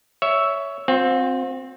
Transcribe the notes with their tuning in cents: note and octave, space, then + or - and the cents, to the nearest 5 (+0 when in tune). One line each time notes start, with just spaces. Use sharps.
C#5 +15 E5 +0
C4 +0 F4 +45